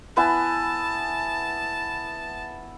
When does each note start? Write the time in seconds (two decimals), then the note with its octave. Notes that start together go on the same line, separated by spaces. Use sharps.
0.17 B3 E4 G#5 A5